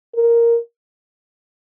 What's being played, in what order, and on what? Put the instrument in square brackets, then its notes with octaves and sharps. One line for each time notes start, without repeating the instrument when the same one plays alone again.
[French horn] A#4